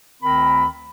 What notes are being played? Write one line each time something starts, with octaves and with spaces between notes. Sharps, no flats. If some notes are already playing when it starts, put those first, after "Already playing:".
D2 D#3 C4 A#4 B5